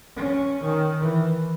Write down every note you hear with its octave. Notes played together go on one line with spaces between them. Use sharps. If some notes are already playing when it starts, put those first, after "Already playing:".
C#4
D#3
E3